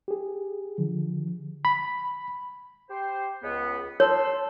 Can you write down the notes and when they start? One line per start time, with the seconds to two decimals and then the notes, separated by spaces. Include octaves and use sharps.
0.08 G4 G#4
0.78 D3 F3
1.65 B5
2.90 G4 C5
3.43 C#2 B3
4.00 C#5 A5 C6 E6